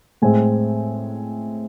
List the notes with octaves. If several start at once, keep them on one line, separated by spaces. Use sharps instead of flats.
A2 G#3 C4 G#5